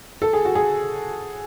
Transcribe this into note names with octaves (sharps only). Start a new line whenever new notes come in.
A4
G#4
F#4
G#4